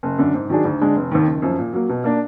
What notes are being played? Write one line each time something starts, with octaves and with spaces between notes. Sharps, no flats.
F#1
F#2 D3
G#2
D#3 F#3 D4 G#4
D2
D3 G#3 D4
F1
D#2 D#3
F#1
F#2 F3
A#2
F#3 A#3
B2
A#3 D4